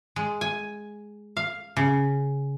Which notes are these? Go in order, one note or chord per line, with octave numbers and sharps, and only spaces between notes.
G#3
G#5
F5
C#3